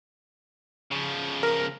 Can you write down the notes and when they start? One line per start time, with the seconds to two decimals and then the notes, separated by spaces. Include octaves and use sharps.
0.91 C#3 F3
1.43 A#4